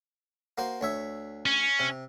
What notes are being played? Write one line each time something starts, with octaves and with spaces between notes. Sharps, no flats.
A#3 F#4 C5
D2 C#5 E5
C#4
C3